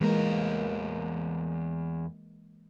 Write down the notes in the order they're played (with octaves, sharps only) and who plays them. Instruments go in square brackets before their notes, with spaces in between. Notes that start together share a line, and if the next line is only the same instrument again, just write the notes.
[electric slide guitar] E2 A#4 [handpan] E3 G#3 A#3